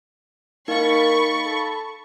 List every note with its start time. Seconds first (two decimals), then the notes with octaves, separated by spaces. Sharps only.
0.68 A#3 D#4 F5 B5 C#6 A6
1.45 A4